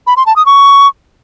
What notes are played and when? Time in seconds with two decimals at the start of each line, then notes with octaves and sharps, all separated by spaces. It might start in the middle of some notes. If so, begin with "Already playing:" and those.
0.07 B5
0.17 C6
0.26 A5
0.36 D#6
0.46 C#6